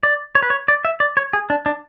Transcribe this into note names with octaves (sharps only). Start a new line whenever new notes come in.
D5
C#5
B4
C#5
D5
E5
D5
C#5
G#4
D4
D4